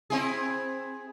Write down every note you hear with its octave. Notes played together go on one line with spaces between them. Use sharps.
C4 E4 G#4